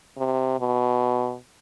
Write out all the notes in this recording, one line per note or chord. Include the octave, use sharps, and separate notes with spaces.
C3
B2